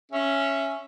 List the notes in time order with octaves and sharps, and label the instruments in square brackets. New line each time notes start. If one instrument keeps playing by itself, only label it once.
[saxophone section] C#4 E5